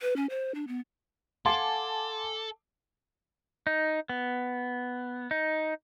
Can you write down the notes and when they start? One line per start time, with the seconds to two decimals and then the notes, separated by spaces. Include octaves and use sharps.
0.02 B4
0.16 C#4
0.30 C5
0.55 D4
0.68 B3
1.46 A4 F5 F#5 G#5 A5 C6 D6
3.67 D#4
4.09 B3
5.31 D#4